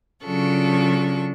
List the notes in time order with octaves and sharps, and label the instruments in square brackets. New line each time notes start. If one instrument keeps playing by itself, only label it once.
[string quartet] C#3 F#3 D4 F4 A4 C#6